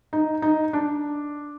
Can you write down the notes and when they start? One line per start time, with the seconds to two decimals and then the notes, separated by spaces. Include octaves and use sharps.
0.13 D#4
0.42 D#4
0.73 D4